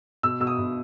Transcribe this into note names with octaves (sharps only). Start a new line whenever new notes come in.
B2 E6
B2 E6
D#6
B2